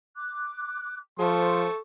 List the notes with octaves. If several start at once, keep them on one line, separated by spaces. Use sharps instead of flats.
D6 F#6
F3 A4 C5 C6 C#6